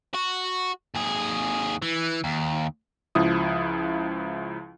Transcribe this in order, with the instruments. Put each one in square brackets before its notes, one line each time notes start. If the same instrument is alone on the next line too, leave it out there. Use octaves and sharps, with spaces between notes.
[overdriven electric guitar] F#4
D#2 G#4
E3
D#2
[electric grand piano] C#2 F3 E4 D#6